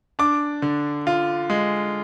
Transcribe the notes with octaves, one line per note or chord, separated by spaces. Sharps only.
D4 D6
D3
F4
G#3